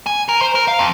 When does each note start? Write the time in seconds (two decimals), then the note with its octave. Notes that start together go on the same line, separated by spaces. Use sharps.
0.06 G#5
0.29 A#4
0.41 C5
0.55 A#4
0.68 F5
0.79 F2